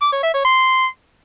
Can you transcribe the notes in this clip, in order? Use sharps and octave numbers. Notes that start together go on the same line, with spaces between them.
D6
C#5
E5
C#5
C6